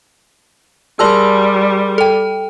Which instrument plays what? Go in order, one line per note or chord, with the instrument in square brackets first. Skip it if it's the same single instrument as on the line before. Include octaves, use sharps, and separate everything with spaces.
[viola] G3 [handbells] G#4 A#4 C6 [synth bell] D5 A5 E6
[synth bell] A4 G5